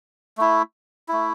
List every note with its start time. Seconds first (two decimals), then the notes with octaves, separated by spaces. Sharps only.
0.38 A3 E4
1.08 A3 E4